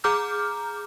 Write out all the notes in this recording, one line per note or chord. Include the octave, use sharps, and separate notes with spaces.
G#4 A#5 D6 F6 G6